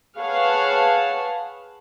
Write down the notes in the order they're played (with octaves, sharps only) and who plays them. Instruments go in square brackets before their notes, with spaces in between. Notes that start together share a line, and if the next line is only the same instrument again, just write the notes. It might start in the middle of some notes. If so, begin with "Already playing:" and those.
[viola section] G#4 B4 C#5 F5 F#5 A5